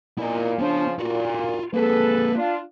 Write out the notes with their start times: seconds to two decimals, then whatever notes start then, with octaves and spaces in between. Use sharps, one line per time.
0.18 A#2 E4 D#5
0.59 C#3 F3 B3 D4
0.99 A#2 F4 F#4
1.74 A#3 C4 G#4 A4 B4
2.36 D4 F4